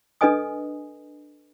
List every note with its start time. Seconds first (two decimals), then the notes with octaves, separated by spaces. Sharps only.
0.21 D4 A4 B4 D#5 G#5 D#6